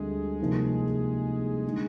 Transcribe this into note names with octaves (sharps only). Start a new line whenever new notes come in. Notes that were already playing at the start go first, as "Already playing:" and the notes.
Already playing: D2 D3 G3 G#3 C4
C2 C3 F3 A#3 D#4
D3 G#3 D#4